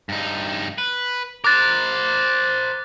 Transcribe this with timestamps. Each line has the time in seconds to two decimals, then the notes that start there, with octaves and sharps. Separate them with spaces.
0.09 G2 D#4
0.78 B4
1.44 A#4 C5 D6 F#6 A6